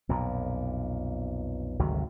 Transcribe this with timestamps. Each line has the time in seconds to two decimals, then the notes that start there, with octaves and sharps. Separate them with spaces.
0.09 B1 F2 A#2
1.79 G#1 D2 C3 F#3